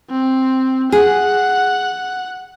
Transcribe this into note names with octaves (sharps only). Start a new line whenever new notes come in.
C4
G#4 F#5